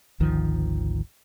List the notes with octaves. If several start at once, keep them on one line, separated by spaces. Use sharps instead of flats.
G#1 D2 D#3 F3